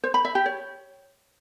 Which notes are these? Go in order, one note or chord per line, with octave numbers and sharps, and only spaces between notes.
C5
B5
E5
G4
C#5